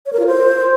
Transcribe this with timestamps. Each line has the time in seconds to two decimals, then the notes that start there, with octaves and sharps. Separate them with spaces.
0.06 C#5
0.13 A#4
0.19 F4
0.26 C5